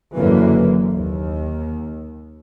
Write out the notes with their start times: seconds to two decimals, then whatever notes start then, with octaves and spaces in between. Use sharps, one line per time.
0.14 F#1 F#2 D3 E3 A#3
0.92 D#2